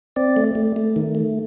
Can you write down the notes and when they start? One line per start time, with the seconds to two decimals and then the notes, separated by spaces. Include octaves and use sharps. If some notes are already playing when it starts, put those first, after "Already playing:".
0.16 C4 D5
0.36 A3
0.55 A3
0.76 A3
0.96 D#3
1.15 A3